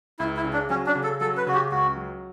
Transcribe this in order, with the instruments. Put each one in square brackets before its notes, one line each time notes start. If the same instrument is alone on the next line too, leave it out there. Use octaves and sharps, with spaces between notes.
[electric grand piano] C#2 [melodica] E4
[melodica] E4
[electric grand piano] C#3
[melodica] D4
[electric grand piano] F#3 [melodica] C#4
[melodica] D4
[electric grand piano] C#3
[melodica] A4
[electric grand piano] F#3 [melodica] A4
[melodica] B4
[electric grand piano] C#3 [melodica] F#4
[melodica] G4
[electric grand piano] C#2 [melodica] F#4
[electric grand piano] F#3